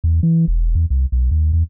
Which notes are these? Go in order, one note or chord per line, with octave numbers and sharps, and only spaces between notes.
E2
E3
E1
E2
C2
B1
D#2
E2